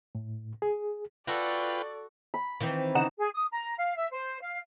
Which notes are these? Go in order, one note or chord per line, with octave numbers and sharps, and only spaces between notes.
A2
G#4
F4 F#4 A4 B4 D5 G5
B5
D#3 E3 C4
C#3 D#4 F#5 E7
G#4
D#6
A#5
F5
E5
C5
F5